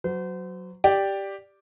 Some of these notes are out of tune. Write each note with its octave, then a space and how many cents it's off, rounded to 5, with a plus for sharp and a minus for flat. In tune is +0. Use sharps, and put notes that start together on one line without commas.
F#3 +0 C5 -35
G4 +0 D5 +0